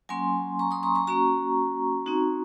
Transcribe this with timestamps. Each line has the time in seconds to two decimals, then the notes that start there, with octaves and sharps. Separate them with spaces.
0.09 F#3 A#3 C#4 G#5 C6
0.59 A#5 C#6
0.71 C6 D#6
0.83 A#5 C#6
0.95 A#5 C#6
1.07 A#3 C#4 F#4 A#5 C#6
2.06 C4 D#4 F#4